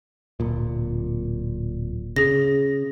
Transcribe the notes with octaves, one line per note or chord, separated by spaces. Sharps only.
D1 A#2
C#3 G#4 A#6